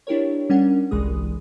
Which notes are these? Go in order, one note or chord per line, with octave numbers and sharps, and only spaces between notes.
D4 E4 G4 A#4 C#5
G3 C#4 D4 A#4 F#5
G1 C2 E3 G#3 G#4 D#6